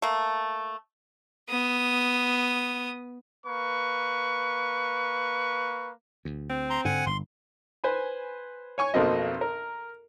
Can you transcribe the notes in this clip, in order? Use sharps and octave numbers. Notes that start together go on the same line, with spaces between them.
A3 A#3
B3 D#6
A#3 B4 C#6
D2
C4
A#5 C6
G#2 D3 F#5 G#5
G1 C6
B4 C5 G#5 B5
C#5 G#5 C#6
B1 F2 A#3 C4 F#4 D#5
A#4